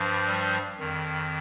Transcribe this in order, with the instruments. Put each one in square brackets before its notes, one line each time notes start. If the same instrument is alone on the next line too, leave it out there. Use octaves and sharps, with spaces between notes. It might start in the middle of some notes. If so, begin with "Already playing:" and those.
Already playing: [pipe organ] G2 F3
G3
F2 D#3